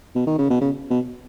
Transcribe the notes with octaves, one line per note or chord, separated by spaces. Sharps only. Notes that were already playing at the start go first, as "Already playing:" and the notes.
B2
D#3
C#3
B2
C#3
B2